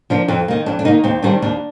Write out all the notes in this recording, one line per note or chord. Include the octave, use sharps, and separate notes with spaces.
F3 A#3 D4
F2 C4
D#3 A#3
F2 D4
D4
D#3 A#3 D#4
D#2 C4
D#3 G3 C4 D4
D#2 D4